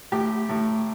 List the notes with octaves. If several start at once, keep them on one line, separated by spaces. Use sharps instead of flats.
A2 G4
A2